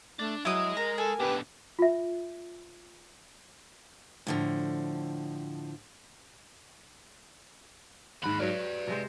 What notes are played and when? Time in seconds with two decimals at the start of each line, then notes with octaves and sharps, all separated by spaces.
0.19 A3 D4
0.45 F#3 G#3 E4 D#5 D#6
0.77 A#4 A#5
0.98 A4 G#5
1.20 B2 D3 G4 B4
1.79 F4 E5
4.27 A2 D3 F3
8.23 D#2 G#2 F#5 B5
8.39 F#3 B4 C#5 D5 F5
8.88 C3 G#3 C5